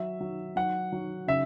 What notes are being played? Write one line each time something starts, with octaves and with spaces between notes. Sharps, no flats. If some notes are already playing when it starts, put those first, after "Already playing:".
Already playing: F#3 E5
F#3
F#3 F#5
F#3
C#3 E5